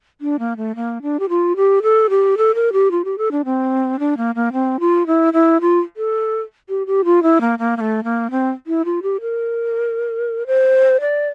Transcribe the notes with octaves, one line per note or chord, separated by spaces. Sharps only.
D4
A#3
A3
A#3
D4
G4
F4
G4
A4
G4
A4
A#4
G4
F4
G4
A4
D4
C4
D4
A#3
A#3
C4
F4
E4
E4
F4
A4
G4
G4
F4
E4
A#3
A#3
A#3
A3
A#3
C4
E4
F4
G4
A#4
C5
D5